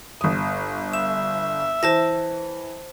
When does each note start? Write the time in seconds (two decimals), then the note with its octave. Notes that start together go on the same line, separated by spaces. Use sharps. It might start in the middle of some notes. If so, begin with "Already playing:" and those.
0.21 G1 D#6
0.93 E5 E7
1.83 E3 C5 A5 A#6